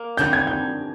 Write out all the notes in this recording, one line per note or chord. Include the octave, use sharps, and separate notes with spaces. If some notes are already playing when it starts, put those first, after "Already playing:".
Already playing: A#3
F2 D3 G3 C4 G6
G#6
G6